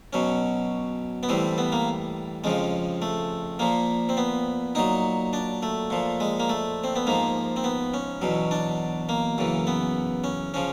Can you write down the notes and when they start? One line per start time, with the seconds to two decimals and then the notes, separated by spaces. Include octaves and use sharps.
0.13 B2 F#3 C#4
1.23 B3
1.29 A2 E3 G3 C4
1.58 B3
1.72 A#3
2.44 F2 C#3 F3 G#3
3.02 A3
3.59 A#2 F3 A#3
4.09 C4
4.17 B3
4.75 A#2 F#3 D#4
5.33 D4
5.63 A3
5.90 A#2 F3
6.20 G#3
6.40 A#3
6.49 A3
6.84 C4
6.96 B3
7.07 G#2 F3 A#3
7.56 C4
7.64 B3
7.94 C#4
8.22 E2 B2 F#3
8.51 D4
9.09 A#3
9.38 F#2 C#3 E3
9.67 B3
10.24 C#4
10.54 C#3 F3 C#4